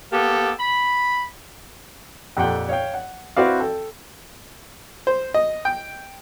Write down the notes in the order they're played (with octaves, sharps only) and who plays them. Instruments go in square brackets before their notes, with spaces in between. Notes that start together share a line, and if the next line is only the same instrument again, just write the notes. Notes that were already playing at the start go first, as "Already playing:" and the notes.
[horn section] A#3 B3 G4 A4
B5
[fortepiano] F2 A#2 G4 A4 F#5 G5
C#5 F5 G5
F#5
C4 E4 F#4 B4 D5 F5
A4 G5
C5
D#5
G5